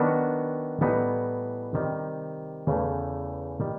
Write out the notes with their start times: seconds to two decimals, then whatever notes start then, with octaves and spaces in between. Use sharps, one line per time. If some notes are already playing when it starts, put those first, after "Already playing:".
Already playing: D#3 F#3 B3 D4 F#4
0.81 A2 E3 G3 B3 D#4
1.74 C3 D#3 G3
2.67 E2 C#3 E3 A3
3.60 D#3 G3